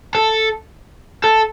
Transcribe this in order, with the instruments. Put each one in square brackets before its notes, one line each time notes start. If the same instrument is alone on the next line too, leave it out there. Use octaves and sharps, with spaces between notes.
[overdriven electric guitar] A4
A4